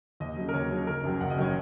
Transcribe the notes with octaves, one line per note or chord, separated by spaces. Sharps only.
D#2 D#5
C#3 F#3
A#4
D#2 C#5
C#3 F#3
F#1 A#4
F#2 D#3 F#3
F#1 F#5
D#5
F#2 D#3 F#3 C#5